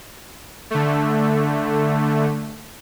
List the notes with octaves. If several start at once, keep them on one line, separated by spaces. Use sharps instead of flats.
D3 A3